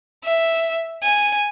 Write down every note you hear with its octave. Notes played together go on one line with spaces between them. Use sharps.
E5
G#5